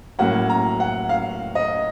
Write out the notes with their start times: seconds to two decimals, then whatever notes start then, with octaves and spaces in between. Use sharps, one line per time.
0.19 A2 F#3 A#3 C#4 F#5
0.50 A#5
0.80 F#5
1.09 F5
1.55 D#5